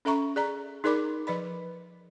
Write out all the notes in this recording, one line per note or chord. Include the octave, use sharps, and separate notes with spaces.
C#4 A4 E5 A#5 C#6
G#4 D5 A#5
D#4 G#4 A#4 D5 B5 D6
F3 B4 D5 B5